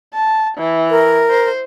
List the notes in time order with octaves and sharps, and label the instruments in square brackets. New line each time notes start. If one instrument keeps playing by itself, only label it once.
[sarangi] A5
E3
[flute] A#4
[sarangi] C5